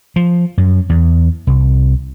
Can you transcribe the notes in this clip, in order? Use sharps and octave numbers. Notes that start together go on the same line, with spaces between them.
F3
F#2
E2
C2